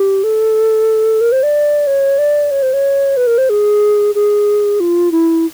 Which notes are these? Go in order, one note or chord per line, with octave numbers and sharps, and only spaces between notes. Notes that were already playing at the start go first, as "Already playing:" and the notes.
Already playing: G4
A4
A#4
C5
D5
C#5
D5
C#5
C5
C#5
B4
A#4
C5
G#4
G#4
F4
E4